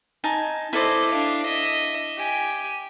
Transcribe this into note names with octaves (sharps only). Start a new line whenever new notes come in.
D#4 G#5 A5
E4 A4 C5 D5 D#5
D4 F5
D#5 E5
G4 G#5